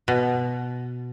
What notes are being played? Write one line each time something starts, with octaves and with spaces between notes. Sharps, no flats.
B2